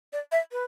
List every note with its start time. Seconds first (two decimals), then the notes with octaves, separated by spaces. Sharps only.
0.13 D5
0.32 E5
0.52 B4